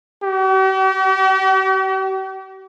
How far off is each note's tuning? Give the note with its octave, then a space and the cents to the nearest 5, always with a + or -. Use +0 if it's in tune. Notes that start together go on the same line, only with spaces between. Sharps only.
G4 -45